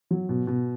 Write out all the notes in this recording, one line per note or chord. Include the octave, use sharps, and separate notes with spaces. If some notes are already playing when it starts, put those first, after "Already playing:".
F#3
B2
B2